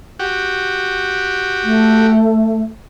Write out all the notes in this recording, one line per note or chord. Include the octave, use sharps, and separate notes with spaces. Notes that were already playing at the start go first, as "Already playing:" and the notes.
F#4 G4
A3